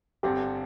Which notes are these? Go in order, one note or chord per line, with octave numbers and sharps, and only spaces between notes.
G1 G2 D3 C4 G4